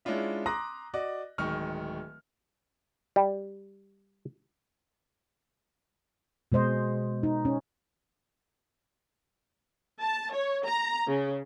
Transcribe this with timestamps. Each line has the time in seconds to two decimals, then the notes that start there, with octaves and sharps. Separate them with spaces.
0.05 G#3 C#4 D4 E4 F4 E5
0.46 A#5 C6 D6 D#6 F#6 A#6
0.94 F#4 D5 D#5
1.38 D1 D#3 G#3 C#6 F6
3.16 G3
6.52 B2 G#3 C5 D#5
7.23 D#4
7.45 C#4
10.02 A5
10.32 C#5
10.66 A#5
11.08 C#3